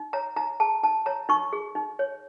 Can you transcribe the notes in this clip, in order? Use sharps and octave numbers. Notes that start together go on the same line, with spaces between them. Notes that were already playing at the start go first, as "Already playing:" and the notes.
Already playing: D#4
C#5 A#5
D#4 A#5
G#4 A5
D#4 A5
C#5 A#5
D#4 C#6
G#4
D#4
C#5